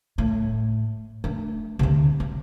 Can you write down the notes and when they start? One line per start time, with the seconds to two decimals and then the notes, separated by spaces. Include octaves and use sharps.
0.18 A2
1.24 A3 D4
1.79 D2 C3
2.20 F#3